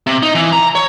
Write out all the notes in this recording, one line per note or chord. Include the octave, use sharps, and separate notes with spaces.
C3
D#4
E3
A#5
C#5